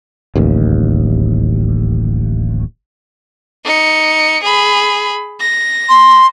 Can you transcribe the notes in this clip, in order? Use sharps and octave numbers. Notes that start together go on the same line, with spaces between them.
D1 A1 D#2
D#4 C#7
G#4 B5
A#6
C6